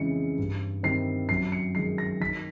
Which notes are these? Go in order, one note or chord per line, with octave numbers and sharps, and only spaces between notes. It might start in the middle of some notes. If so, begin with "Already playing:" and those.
Already playing: F2 C#3 E3 G#3 C#7
G2
D#3 G3 C4 C7
F#2 C7
C#7
D#3 G#3 C7
A#6
D#3 B6